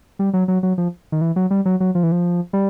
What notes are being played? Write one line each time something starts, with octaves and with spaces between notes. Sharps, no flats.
G3
F#3
F#3
F#3
F3
D#3
E3
F#3
G3
F#3
F#3
F3
E3
F3
G3